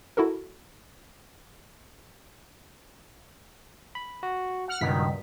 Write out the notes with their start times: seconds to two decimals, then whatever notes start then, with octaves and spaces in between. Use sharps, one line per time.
0.17 E4 F#4 A4 A#4
3.95 B5
4.23 F#4
4.68 F#5 F6
4.81 C#2 G2 B2 D#3 B6